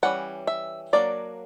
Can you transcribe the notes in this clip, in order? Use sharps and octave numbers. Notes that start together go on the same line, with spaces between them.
E3 G3 C#4 F#5
E5
F#3 A#3 D4 D5